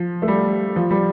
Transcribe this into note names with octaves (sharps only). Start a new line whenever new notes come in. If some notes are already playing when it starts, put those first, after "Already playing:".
Already playing: F3
A3
G3
F3
G3